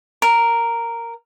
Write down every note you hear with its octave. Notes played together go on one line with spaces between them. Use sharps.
A#4